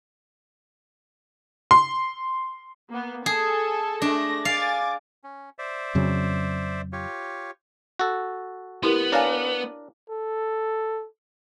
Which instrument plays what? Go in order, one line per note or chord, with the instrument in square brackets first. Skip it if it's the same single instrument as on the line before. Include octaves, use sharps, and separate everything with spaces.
[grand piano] C6
[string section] A#3 B3
[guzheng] G#4 [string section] A4 G#5
[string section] A3 A#6 [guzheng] D4
[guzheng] F5 [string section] G#5 D6 A6
[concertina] C#4
C5 D5 E5
[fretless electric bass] F2 C#3 F#3
[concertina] F4 G4 C#5
[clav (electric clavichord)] F#4 A4
[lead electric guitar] B3 [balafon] E4 G4 A#4
[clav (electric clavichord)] D4 A#4 D5 [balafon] C#5 F5 G#5
[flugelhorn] A4